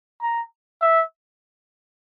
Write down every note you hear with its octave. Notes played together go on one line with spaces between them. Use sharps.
A#5
E5